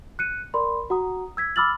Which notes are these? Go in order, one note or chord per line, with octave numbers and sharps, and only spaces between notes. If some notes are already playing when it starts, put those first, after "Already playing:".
F#6 C#7 D#7
A#4 D5 B5 C6
F#4 F#5 A#5 D#6
E6 G#6 B6
B5 D6 E6 F6 A6 F#7